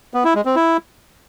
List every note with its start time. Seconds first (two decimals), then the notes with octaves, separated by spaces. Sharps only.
0.14 B3
0.24 E4
0.35 G#3
0.45 C4
0.56 E4